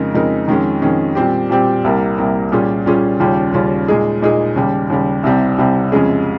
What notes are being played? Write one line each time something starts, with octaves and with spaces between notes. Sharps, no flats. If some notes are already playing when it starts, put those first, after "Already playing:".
Already playing: F2 C#3 G#3 D#4 A#4
F2 C#3 G#3 D#4 A#4
F2 D#3 G#3 C#4
F2 D#3 G#3 C#4
A#2 G3 C4 G4
A#2 G3 C4 G4
C2 C3 G3 A#3
C2 C3 G3 A#3
A#2 G3 C#4 F4 G#4
A#2 G3 C#4 F4 G#4
D#2 C#3 G3 C#4 F4
D#2 C#3 G3 C#4 F4
A#2 G#3 D#4 G#4
A#2 G#3 D#4 G#4
D#2 C#3 G3
D#2 C#3 G3
C2 C3 G3 C4
C2 C3 G3 C4
F2 C#3 G#3 C#4 G#4